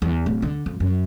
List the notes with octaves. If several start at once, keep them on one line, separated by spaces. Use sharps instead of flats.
E2
D1
D3
F2
F#2